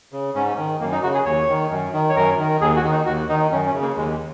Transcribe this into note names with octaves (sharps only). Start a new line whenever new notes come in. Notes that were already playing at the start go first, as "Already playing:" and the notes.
C#3
G#2 C#4
D#3
F#2 A#3
D#4
C#3 F#4
G#4
D#2 C#5
D#3
F#2
D#3
C#5
F#2 A#4
D#3
D#2 G#4
F#4
D#3
D#4
D#2 F#4
D#3 D#4
F#2 C#4
C#4
C#3
A#3
D#2 G#3